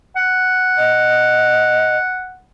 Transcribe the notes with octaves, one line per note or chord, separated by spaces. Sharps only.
F#5
D#5